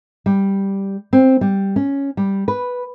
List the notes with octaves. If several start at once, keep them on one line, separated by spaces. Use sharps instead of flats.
G3
C4
G3
C#4
G3
B4